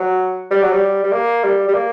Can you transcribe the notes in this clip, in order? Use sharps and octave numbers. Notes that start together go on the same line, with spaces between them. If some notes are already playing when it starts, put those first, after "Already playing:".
Already playing: F#3
G3
F#3
G3
G3
A#3
G3
G3
A#3